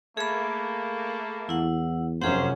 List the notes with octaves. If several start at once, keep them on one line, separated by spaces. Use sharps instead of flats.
A3 A#3 G#4 B5
E2 E4 F#5
F1 F#2 C#4 G#4 A#4 C5 F5 F#5